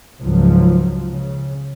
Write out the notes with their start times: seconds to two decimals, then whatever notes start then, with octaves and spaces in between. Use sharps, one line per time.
0.21 C#2 G#2 F3 F#3
1.10 C#3